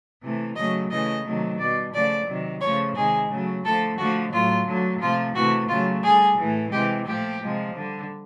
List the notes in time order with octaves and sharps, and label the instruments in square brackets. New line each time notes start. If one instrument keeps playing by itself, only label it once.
[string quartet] C3 E3 A3
C#3 F#3 A3 D#5
C#3 E3 A3 D#5
C3 D#3 F#3 A3
B2 G3 D5
C#3 F3 A3 D5
C3 D#3 F#3
C#3 F3 A3 C#5
C3 D#3 G#3 G#4
C#3 F#3 A3
D3 F3 A3 A4
D3 F3 A3 F#4
A2 F#3 A3 F4
D3 F#3 A3
C3 F3 A3 F4
C3 E3 A3 F#4
C#3 F#3 A3 F4
D3 G3 G#4
A2 E3 A3
C3 E3 G#3 G4
A#2 F3 A3 G4
C3 F3 G#3
D3 G3